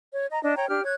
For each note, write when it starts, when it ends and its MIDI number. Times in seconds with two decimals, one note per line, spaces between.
0.12 0.26 73
0.31 0.39 75
0.31 0.39 82
0.43 0.54 62
0.43 0.54 75
0.56 0.69 73
0.56 0.69 79
0.56 0.69 82
0.69 0.84 62
0.69 0.84 67
0.69 0.84 89
0.84 0.94 73
0.84 0.94 90
0.84 0.94 92